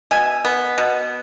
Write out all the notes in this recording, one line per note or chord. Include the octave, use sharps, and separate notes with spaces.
B2 E5 G#5
B3
B2